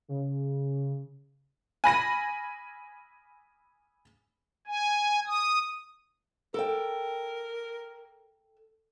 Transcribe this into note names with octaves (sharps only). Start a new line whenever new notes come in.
C#3
G#5 B5 A#6 D#7
G#5
D#6
A4 A#4 G5